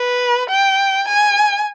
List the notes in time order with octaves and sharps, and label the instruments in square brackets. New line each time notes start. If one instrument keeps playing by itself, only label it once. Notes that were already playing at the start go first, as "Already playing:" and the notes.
Already playing: [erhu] B4
G5
G#5